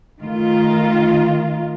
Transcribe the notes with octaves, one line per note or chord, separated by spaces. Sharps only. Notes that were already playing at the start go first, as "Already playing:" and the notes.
D#3 A3 F4